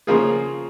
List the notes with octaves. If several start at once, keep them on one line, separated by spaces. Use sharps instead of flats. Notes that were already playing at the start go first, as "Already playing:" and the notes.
C#3 F3 A#3 F4 G#4